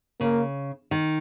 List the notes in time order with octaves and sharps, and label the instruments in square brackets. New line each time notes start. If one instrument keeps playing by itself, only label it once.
[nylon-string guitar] C#3 [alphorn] A#3
[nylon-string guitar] D#3